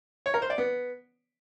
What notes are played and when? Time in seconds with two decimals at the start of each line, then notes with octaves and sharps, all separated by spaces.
0.26 C#5
0.34 A#4
0.42 C5
0.50 D5
0.58 B3